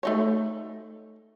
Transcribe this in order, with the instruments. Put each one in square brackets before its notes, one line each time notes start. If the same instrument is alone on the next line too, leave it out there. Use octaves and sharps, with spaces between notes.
[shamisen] A3 D#4 C#5